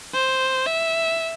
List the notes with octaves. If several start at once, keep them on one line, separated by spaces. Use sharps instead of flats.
C5
E5